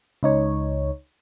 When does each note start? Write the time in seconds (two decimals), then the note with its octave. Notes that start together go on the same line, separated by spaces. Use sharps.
0.23 C#2 D#4 C#5